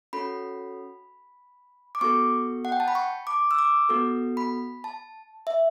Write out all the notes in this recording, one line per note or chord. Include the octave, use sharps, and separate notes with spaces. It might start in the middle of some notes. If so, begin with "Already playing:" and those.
C#4 F#4 A4 B5
D6
B3 F#4 A4 C#6
F#5
G5
A5
B5
C#6
D6
E6
D6
B3 F#4 A4
B5
A5
E5